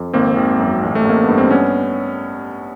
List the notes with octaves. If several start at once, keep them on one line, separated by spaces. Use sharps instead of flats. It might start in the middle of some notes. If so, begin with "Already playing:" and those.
Already playing: F2
G#1 A#3 C4
G#1
F#2
A1
A3
A1 A#3
G2 B3
C4
B3 C#4